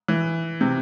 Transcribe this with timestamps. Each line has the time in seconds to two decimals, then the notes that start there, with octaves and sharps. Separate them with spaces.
0.08 E3
0.61 C3